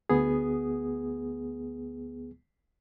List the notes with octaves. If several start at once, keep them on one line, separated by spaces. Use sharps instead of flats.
D2 B3 G#4